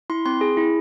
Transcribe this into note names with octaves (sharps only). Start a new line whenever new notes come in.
E4 C6
C4 C6
G#4
E4